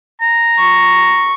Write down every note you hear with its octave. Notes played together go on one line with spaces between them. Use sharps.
A#5
C#6